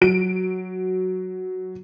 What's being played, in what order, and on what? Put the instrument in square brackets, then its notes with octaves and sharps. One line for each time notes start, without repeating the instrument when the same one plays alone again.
[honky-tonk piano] F#3 D7